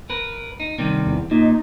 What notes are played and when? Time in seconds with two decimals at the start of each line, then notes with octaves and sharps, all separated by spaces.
0.10 A#4 B4
0.60 D#4
0.79 C3 D#3 G3
1.06 E2
1.31 A#2 D#4